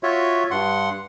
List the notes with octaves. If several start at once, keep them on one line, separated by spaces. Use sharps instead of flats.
F4 F#4 C#5 E5
G2 F#5 C6